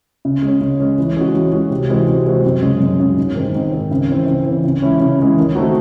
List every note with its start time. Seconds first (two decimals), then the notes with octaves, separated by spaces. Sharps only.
0.25 C#3
0.42 G#3 C#4
0.61 C#3
0.80 G#3 C#4
0.98 E3
1.17 G#3 C#4 F#4
1.34 E3
1.52 G#3 C#4 F#4
1.70 C3
1.89 E3 G#3 C4 F#4
2.07 C3
2.25 E3 G#3 C4 F#4
2.44 F#2
2.62 C#3 G#3 C#4
2.80 F#2
3.00 C#3 G#3 C#4
3.17 G#2
3.35 D#3 G#3 C4
3.54 G#2
3.72 D#3 G#3 C4
3.91 C#3
4.10 E3 C4
4.27 C#3
4.45 E3 C4
4.65 C#3
4.82 E3 G#3 C#4 E4
5.00 C#3
5.20 E3 G#3 C#4 E4
5.37 D#3
5.55 A3 C4 D#4 F#4